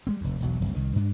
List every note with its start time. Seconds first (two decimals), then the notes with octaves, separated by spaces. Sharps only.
0.07 G3 G#3 C4
0.21 F1 D#2
0.41 E1 B1 F#3
0.61 F1 C2
0.75 C2 D#3
0.96 G2 D4